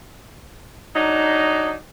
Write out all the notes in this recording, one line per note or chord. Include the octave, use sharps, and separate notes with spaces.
F#3 D4 D#4